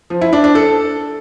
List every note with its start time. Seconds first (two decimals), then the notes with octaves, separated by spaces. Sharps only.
0.10 F3
0.21 E4
0.33 D4
0.44 D4
0.55 A4